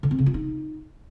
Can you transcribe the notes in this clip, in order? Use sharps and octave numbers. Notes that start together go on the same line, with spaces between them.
D3
C4
C#3
F4
D#4